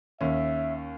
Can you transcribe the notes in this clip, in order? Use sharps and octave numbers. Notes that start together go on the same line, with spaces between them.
D#2 C#4 E5